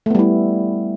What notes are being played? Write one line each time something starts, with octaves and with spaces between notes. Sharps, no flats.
G3 A3 B3 E4